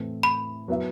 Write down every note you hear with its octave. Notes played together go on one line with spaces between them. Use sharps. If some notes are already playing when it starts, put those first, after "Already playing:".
Already playing: A2 E3 A3 C4
B5
F#3 B3 E4 B4 E5